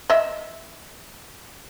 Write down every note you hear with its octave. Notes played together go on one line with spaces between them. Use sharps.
D#5 E5